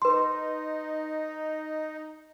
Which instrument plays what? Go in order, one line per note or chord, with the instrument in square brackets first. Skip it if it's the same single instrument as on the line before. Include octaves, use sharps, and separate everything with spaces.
[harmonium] D#4 [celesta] B4 C6